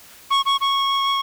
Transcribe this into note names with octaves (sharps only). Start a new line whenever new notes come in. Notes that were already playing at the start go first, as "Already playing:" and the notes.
C#6
C#6
C#6